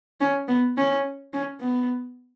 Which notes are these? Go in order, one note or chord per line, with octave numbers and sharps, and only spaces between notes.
C#4
B3
C#4
C#4
B3